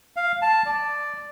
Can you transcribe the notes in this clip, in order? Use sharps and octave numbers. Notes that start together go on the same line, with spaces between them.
F5
A5
D5